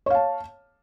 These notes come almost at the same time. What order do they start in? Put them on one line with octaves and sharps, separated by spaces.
C#5 F5 A5